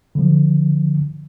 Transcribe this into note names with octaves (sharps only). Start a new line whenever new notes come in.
D3 F3